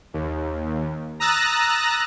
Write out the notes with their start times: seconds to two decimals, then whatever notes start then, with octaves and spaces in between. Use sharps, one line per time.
0.14 D#2
1.20 A#5 D#6 E6 F#6 A6 A#6